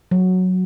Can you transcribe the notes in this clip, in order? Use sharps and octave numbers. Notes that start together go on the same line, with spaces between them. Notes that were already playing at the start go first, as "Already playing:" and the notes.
F#3